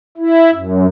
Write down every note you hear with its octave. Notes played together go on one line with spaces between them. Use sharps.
E4
F#2